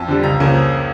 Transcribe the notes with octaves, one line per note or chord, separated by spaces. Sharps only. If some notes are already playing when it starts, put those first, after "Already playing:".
Already playing: F2 A5
D3 G3
C#2 A#5
C#3 F3 A#3